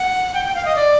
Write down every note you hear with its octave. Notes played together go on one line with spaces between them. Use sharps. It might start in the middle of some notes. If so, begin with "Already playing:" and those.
Already playing: F#5
G5
G5
F5
D#5
D5